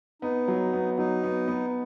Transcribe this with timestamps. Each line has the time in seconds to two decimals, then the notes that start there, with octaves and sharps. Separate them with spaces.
0.22 B3 D#4
0.48 F#3
0.73 B3
0.98 F#3 D#4
1.23 B3
1.48 B3